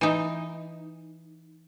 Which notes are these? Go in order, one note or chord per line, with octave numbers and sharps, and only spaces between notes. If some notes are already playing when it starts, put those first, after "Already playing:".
E3 D#4